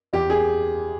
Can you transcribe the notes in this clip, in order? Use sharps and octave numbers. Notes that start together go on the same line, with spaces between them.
E2 G4
G#4